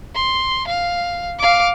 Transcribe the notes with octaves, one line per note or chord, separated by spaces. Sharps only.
C6
F5
F5 D6